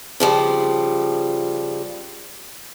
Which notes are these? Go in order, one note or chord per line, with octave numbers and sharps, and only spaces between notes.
C#3 F3 G3